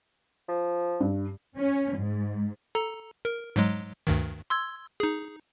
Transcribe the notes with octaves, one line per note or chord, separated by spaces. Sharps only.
F3
G2
C#4
G#2
A4 A#5
A#4
G#2 F#3 G#3
D2 G2 D#3
C6 E6 G#6
D#4 G#4